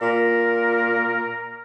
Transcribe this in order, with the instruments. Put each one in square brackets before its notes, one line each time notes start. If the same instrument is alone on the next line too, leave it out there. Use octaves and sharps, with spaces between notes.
[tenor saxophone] A#2 [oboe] A#4